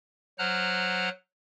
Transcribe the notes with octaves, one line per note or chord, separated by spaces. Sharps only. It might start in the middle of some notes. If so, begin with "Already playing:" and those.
F#3 C5 F#5 A#5 F6 F#6